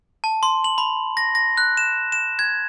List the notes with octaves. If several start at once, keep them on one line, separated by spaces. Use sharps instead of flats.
A5
C6
F#7
B5
A#6
A#6
F#6
E7
E7
G#6